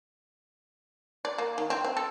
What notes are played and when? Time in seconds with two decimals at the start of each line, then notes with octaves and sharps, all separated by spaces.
1.25 D5
1.38 A#3
1.58 D#3
1.70 C4
1.84 C4
1.97 A4